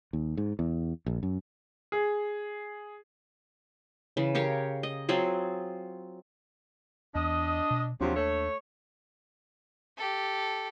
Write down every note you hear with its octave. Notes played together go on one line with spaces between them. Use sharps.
D#2
G#2
E2
A#1
F#2
G#4
C#3 E3
G4 A#4 C#5 F5
D#5
F#3 C4 F4 G#4
E2 D4 D#5
B2
D#2 C3 F3 F#3 D4
A3 C#5
G4 A4